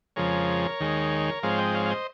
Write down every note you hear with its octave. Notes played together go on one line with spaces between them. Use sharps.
F2 C#3 F3 G#3 A#4 C#5
D#2 D#3 G#3
G#2 F3 G#3 C4 C#5 F5
D#5 G5
C#5 F5
F5
C5 D#5